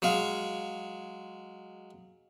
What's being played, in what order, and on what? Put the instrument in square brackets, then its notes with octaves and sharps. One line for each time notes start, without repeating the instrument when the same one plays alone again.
[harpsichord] F#3 G#3 F5